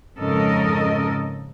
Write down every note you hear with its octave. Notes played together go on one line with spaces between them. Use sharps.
F2 G#2 C#3 A4 A#4 D#5